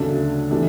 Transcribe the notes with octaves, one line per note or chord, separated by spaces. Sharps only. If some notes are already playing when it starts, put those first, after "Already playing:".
Already playing: D2 C#3 F#3 A3 D4
E3 A3 D4 G4